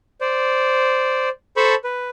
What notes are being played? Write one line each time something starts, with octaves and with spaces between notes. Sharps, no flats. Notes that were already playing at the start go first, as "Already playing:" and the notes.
C5 D5
A4 C5 A5 B5 C#6
B4